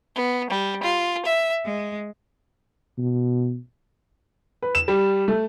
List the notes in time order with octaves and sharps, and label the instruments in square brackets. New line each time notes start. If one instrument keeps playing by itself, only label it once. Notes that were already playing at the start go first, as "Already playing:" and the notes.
[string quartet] B3
G3
F4
E5
G#3
[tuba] B2
[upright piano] B4
E7
G3
A3